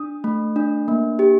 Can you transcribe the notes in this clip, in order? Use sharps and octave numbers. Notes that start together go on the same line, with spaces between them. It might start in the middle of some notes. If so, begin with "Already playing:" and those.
Already playing: D4 D#6
A3
D4
A#3
G4